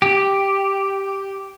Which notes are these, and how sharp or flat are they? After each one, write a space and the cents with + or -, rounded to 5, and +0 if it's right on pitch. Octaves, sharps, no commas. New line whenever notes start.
G4 +0